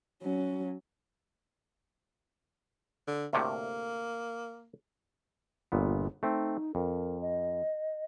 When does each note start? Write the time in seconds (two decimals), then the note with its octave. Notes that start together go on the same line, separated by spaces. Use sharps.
0.22 F#3 C#4
3.07 D3
3.33 D2 A2 C3 A#3
5.72 G1 A#2 B3
6.23 A3 C4 D#4
6.75 F2 A#4
7.21 D#5